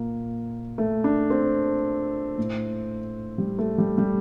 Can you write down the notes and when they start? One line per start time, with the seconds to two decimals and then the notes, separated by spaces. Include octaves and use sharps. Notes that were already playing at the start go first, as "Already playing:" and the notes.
Already playing: A#2 A#3
0.78 A3
1.04 D4
1.30 C4
2.38 A2
3.38 G3
3.59 A3
3.78 G3
3.98 G3